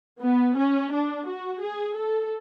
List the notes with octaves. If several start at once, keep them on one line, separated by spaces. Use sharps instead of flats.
B3
C#4
D4
F#4
G#4
A4